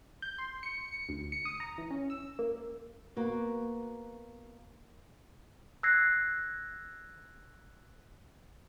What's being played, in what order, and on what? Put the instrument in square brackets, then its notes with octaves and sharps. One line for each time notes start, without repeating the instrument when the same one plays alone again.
[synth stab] G6
C6
C#7
C#7
D2
C#7
D#6
A#5
E3
C#4
E6
A#3
[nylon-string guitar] A#3 B3 F#4
[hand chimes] E6 F#6 G#6 A#6 C7